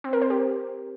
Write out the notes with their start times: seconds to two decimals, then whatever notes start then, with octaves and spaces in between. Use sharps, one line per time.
0.04 C4
0.13 A#4
0.22 C5
0.30 G4